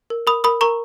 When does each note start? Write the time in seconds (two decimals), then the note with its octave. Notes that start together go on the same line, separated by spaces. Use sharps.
0.10 A#4
0.27 A#4 B5 D#6
0.44 A#4 B5 D#6
0.61 A#4 A#5 C#6